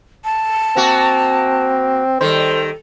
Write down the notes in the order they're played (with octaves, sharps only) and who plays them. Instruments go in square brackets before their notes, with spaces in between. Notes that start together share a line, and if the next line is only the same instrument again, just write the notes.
[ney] A5
[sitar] A#3 F#4 [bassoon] C4
[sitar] D#3 G3 [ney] A4 [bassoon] C5